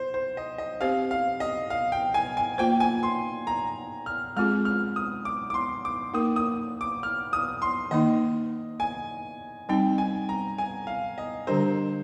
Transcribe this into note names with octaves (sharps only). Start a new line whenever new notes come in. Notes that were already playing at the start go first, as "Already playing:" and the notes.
Already playing: C5
C5
D#5
D#5
C4 G4 C5 F5
F5
D#5
F5
G5
G#5
G#5
A#3 F4 C5 G5
G#5
C6
A#5
F6
G#3 C4 F4 G#4 F6
F6
D#6
D6
D6
C6
D6
A#3 D#4 A#4 D#6
D#6
D6
F6
D#6
C6
D#3 A#3 D#4 D#5
G#5
G3 C4 D#4 G5
G#5
A#5
G#5
F5
D#5
D3 G3 D4 G4 A#4 C5